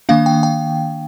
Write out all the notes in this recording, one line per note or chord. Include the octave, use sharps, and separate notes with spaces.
D#3 A#3 D4 F5
G5
G5